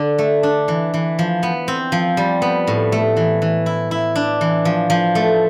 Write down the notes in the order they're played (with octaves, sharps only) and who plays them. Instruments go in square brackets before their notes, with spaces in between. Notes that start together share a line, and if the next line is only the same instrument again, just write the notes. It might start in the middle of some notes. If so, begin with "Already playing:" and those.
Already playing: [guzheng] D3 D4
A3
D4
E3
E3
F3
B3
C4
F3
G3
B3
A2
A3
E3
E3
E4
E4
D4
E3
F3
F3
A3